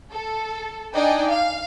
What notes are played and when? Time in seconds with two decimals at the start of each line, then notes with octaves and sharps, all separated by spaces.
0.12 A4
0.95 D4 D#4 D5 D#5 G5 G#5
1.29 F5